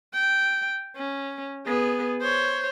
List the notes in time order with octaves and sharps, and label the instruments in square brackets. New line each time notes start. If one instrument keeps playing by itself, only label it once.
[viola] G5
C#4
B3 G#4
C5 C#5